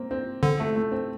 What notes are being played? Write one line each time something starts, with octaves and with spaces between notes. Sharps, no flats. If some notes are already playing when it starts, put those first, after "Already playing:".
Already playing: A#3 C4
C4
D3 C4
A3
A3
C4